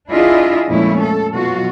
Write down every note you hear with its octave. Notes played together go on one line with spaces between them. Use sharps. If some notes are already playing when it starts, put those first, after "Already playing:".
D4 E4 F4 G#4 D#5 E5
F2 A#2 G#3 A3 C#4 E4
A4
B2 F#3 F4 F#4